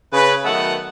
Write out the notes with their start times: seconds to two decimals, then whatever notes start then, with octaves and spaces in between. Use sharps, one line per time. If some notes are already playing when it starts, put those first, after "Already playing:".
0.13 C#3 B4
0.45 D#3 F#3 A3 B3 F#5